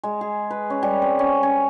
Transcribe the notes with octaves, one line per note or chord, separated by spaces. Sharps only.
G#3
G#4
B4
C#4
G3
C4
C#4
C#4